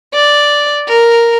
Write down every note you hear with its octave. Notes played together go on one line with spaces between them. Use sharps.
D5
A#4